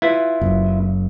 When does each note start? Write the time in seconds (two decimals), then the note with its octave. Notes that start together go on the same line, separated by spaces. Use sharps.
0.02 E4 F4 B4
0.41 F#1 F#2